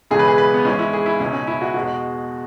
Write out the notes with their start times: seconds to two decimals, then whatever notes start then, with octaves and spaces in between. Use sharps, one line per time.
0.11 E1 E2 C#3 E3 G#3 G#4
0.19 B4
0.28 G#4
0.38 B4
0.54 B3
0.65 G#1 G#2 E3 G#3 C#4
0.79 E4
0.93 G#4
1.06 E4
1.20 C#2 B2 G#3 C#4
1.33 C#4
1.47 E4
1.61 F#4
1.74 E2 B2 G#3 F#4